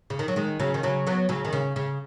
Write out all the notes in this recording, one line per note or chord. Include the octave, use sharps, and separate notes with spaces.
C#3
D#3
F#3
D#3 G#3
C#3 F#3
D#3
C#3 F#3
F#3 B3
C#3 F#3
D#3
C#3
C#3